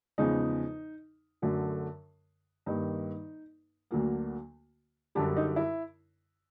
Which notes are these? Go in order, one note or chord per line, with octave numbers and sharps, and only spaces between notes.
E2 C#3 F3 G#3 D#4
F#2 D3 F#3 A3
G2 D#3 G3 A#3 D#4
D2 D3 F#3 A#3
F#2 D3 G3 D4
D#4
E4